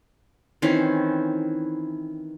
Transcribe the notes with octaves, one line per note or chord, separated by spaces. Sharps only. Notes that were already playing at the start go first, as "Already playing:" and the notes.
D#3 E3 C4 C#4